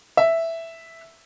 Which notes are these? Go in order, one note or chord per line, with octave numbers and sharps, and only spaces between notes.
E5